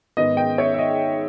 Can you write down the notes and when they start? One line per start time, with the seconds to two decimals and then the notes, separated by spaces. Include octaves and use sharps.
0.17 G#2 D#3 G#3 B3 D#5
0.37 D#5 G5
0.58 C#5 E5
0.74 E5
0.78 D#5